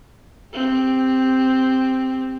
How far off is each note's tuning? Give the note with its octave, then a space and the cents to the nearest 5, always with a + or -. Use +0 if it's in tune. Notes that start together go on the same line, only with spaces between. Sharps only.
C4 +0 G4 +20